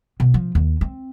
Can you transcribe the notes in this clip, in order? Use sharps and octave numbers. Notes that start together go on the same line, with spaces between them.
B2
F3
D#2
C4